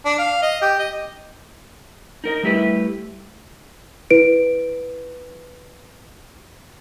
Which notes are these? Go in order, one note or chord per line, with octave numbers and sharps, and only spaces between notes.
D4
F5
D#5
G4
D#5
D#4 A#4 D#5
G3 A3 E4 G4 A4 B4
E4 B4 D7